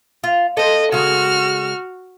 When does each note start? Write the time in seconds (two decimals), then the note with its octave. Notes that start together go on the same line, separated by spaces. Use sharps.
0.24 F4
0.57 A4 C5 D#5
0.92 C#3 G#3 F#4 F6